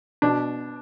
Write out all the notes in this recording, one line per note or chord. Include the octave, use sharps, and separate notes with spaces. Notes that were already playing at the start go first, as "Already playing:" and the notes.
B2 D4